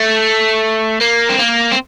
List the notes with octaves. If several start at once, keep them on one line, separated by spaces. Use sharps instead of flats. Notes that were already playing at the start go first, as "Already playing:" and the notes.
Already playing: A3
A#3
C4
A#3
C4